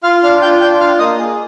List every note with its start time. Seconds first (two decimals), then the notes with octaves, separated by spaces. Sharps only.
0.03 F4 F5 F6
0.23 D4 F5 F6
0.42 F4 G5 G6
0.61 D4 G5 G6
0.80 F4 F5 F6
0.99 A#3 D#5 D#6
1.18 G#4